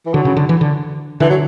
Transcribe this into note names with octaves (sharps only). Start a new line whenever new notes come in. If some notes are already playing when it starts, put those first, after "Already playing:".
E3
D3 F#3
C#3
D3
E3
D3
D3 E3
F#3